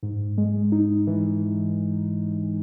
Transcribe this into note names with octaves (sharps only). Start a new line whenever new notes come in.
G#2
G#3
D#4
E3